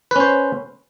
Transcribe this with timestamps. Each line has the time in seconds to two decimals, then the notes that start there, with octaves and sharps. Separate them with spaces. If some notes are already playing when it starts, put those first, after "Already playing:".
0.11 B4
0.16 C#4
0.20 C5